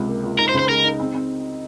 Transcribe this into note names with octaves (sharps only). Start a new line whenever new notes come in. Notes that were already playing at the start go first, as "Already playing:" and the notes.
Already playing: C#2 C3
A#3
C#2
D#4 A#4
C5
C#3
C5
G#3 A#4
D#4
C4
C4